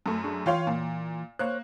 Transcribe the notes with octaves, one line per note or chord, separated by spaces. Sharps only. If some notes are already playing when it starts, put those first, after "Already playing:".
F#2 A3
D4 G#4
E3 F4 C#5 F5 G5 C6
A#2
A#3 C5 C#5 F#6